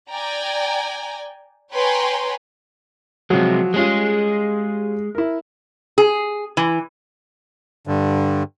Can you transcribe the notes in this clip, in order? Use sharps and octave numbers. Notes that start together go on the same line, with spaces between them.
D5 G5 G#5 A#5
B4 C#5 G5 G#5 A#5 C6
C3 F3 F#3 G#3
G3 G#3 C#4 F4 G#4
E4 A#4
G#4
E3
G2 D3